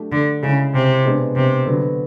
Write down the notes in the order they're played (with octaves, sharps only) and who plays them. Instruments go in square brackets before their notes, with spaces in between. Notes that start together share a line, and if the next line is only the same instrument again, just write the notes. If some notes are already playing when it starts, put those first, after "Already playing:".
Already playing: [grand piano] F#3 A3 D4 G4
[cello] D3
[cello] C#3 [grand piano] G#3 C#4 E4
[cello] C3
[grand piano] B2 G#3 B3 D4
[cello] C3
[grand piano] D3 F#3 B3